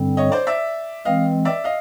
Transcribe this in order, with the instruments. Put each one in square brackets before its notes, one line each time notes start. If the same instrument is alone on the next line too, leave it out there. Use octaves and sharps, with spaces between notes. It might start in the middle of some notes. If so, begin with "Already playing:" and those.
Already playing: [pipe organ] G2 D3 G3 C4
[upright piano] C#5 D#5
C5 D5
D5 E5
[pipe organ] E3 G#3 C4 [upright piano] D#5 F5
[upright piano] D5 E5
D#5 F5